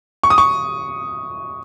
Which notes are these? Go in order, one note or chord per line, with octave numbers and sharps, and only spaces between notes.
C#6
D#6
C#6